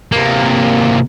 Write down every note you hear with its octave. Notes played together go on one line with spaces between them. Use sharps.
C3 A#3